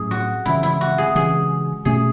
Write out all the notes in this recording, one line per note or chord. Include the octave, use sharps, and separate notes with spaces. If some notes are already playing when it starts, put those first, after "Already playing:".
Already playing: A2 F#3 A3 C#4 G#4
F#4
C#3 E3 G#3 C#4 E4
E4
F#4
G#4
C#3 E3 G#3 C#4 G#4
B2 A3 C#4 G#4